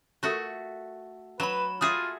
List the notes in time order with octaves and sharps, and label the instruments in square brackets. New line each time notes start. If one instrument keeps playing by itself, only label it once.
[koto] A3 F#4 [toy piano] F4 A4 A#4
[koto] F#3 [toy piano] D4 [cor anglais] B4 [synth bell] B5 E7
[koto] A3 F#4 G#4 [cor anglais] F4 [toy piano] D#6